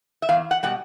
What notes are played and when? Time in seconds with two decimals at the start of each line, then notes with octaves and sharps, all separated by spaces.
0.22 E5
0.29 E2 F5
0.51 F#5
0.63 B2 G3 F#5